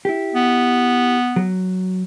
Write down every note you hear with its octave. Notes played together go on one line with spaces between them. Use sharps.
E4 G4
B3
F#3